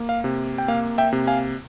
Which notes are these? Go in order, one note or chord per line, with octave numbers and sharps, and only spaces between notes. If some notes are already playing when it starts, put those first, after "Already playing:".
Already playing: A#3
F5
C3
G5
A#3 F5
E5 G5
C3
F5 G#5